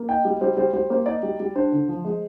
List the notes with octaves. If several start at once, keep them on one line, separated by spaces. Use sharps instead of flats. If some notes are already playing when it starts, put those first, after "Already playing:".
Already playing: A#3
D#4 G5
G3
G3 C5
G3 C5
G3 C5
A#3 C5
D#4 D5
G3
G3
D4 C5
D3
F3
G#3